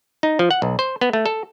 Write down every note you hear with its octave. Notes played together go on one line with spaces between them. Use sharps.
D#4
F3
F#5
B1
C5
B3
A3
A4